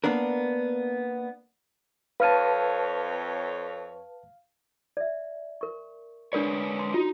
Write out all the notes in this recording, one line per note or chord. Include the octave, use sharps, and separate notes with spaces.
A#3 B3 D4 A#4
F2 B4 C#5 F5 A5 F6 D#7
D5 E5
A#4 C#6
G#3 D4 A#4 B4 C#5 D5
C6
D#4 F4 F#4